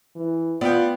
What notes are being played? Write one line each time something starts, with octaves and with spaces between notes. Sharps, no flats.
E3
B3 F4 D5 F5 G5